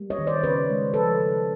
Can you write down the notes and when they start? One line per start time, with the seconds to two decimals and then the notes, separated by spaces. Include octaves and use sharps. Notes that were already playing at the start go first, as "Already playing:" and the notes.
Already playing: G3 A#3
0.10 C#5 D#5
0.19 D#3
0.27 C5 D5
0.43 C#3 B4 C#5
0.69 G#3
0.94 F3 A4 B4
1.19 C#3